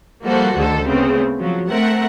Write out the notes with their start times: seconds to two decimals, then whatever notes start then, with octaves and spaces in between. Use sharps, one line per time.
0.23 F3 G3 A#3 F#4 A4 C5
0.56 D2 D3 D#3 A4 C5
0.86 C#3 A3 B3 C4
1.38 F3 F#3
1.70 A3 C4 A#4 E5 F#5